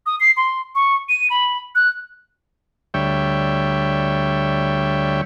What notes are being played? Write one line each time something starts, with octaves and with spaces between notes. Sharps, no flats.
D#6
C7
C6
C#6
D#7
B5
F#6
D2 G3 C#5 E5 G5